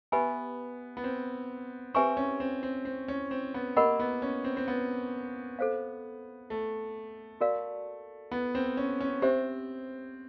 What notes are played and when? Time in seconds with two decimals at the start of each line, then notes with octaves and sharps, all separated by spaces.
0.12 B3 G4 B4 E5 G#5 B5
0.97 B3
1.04 C4
1.94 C4 G4 B4 E5 G#5 C#6
2.17 C#4
2.40 C4
2.63 C4
2.85 C4
3.08 C#4
3.31 C4
3.54 B3
3.77 A#3 G4 A#4 D#5 F#5 B5
4.00 B3
4.22 C#4
4.44 C4
4.57 C4
4.68 B3
5.59 A4 C5 F5
6.50 A3
7.41 F#4 A#4 D5 F5
8.31 B3
8.55 C4
8.77 C#4
9.01 C#4
9.22 C4 G4 C5 E5